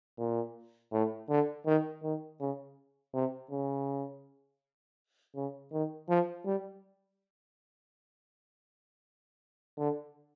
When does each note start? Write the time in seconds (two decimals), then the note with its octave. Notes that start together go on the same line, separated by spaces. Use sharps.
0.19 A#2
0.92 A2
1.29 D3
1.66 D#3
2.03 D#3
2.40 C#3
3.14 C3
3.51 C#3
5.36 C#3
5.72 D#3
6.09 F3
6.46 G3
9.78 D3